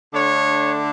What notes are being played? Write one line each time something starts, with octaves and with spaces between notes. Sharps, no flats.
D3 A3 D4 C#5